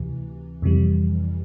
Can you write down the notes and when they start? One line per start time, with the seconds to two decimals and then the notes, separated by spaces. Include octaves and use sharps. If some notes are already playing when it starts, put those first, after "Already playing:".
Already playing: D2 C3 E3
0.62 F2 C3 E3 G3